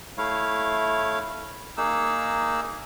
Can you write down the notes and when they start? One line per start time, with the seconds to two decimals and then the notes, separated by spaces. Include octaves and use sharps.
0.18 A3 E4 C#5 F5
1.77 A#3 D#4 G#4 E6